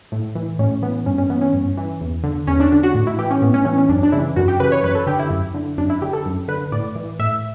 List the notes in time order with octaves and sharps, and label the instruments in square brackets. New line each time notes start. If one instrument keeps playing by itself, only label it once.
[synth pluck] A2
E3
A2 C#4
E3 B3
G2 C#4
C#4
E3 B3
C#4
G2
E3
E2
D3
E2 C#4
D4
D3 D4
F#4
A2
E4
E3 G4
C#4
A2 B3
C#4
E3 C#4
C#4
F#2 D4
D4
C#3 E3 E4
F#2 F#4
G4
C#3 B4
E3
C#5
F#2 B4
A4
D3 G4
E4
F#2
D3
F#2 D4
E4
D3 G4
A4
F#2
D3 B4
A2 D5
E3
A2 E5